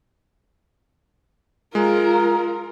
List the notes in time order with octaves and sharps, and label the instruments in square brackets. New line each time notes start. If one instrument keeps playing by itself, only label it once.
[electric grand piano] G#3 [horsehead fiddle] F4 A#4